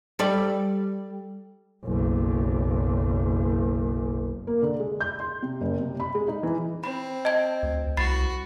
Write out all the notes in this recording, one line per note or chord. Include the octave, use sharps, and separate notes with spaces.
G3 A4 D5
F#1 B1
A#3
D3
G#3
G6
C6
C3
F#1
C3
B5
G#3
D#4
E3
C4 B5
D#5 A5 G#6
D2
C2 F#4 B5 A6 C7